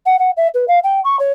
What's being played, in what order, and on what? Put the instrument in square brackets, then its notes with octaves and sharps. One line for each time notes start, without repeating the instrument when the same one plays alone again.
[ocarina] F#5
F#5
E5
B4
F5
G5
C#6
C#5